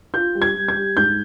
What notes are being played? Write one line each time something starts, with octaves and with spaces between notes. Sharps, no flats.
F4 G6
G3
G#6
G3
G#6
G3
G#2 G6